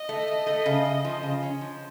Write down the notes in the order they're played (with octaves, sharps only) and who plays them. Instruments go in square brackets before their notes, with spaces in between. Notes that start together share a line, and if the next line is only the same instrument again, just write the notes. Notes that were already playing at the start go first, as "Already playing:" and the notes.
Already playing: [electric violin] D#5
[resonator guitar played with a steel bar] A3
A3
A3
C#3
C#3
F3
C#3
C#4
F3